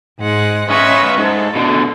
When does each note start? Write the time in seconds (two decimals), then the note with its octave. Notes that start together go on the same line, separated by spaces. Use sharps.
0.20 G#2 G#3 F#5
0.70 C#4 B4 D#5 E5 C#6
1.18 G#2 A4
1.56 B2 D3